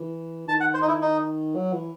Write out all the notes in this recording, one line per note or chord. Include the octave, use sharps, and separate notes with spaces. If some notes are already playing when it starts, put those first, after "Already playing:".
Already playing: E3
D#3 A5
F#5
C5
D#4
E4
D#4
F#3
E3